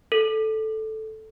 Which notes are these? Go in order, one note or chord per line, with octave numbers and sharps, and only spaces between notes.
A4